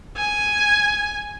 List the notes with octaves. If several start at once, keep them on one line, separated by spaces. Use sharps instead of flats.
G#5